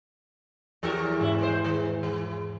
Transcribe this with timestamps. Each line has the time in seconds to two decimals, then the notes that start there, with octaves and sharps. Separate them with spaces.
0.83 E2 F3 G4 A4 A#4
1.19 G#2 C#3 E3 E4
1.39 D#2 G#3 C5
1.64 D#3
2.03 E3